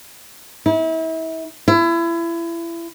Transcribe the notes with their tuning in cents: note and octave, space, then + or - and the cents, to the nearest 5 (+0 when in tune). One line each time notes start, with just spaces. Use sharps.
E4 -35
E4 +30